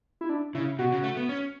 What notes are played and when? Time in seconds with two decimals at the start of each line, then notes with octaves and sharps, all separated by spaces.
0.21 E4
0.29 D4
0.55 C#3 E4
0.79 B2 F#4
0.92 C#3
1.04 A3
1.17 B3
1.29 C#4